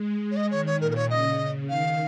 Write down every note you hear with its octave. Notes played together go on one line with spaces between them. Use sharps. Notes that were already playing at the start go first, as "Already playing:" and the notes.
Already playing: G#3
C#5
D#5
D#3 C#5
C#5
A#2 A#4
A#4
C#5
C#3 D#5
C#3
D#3 F5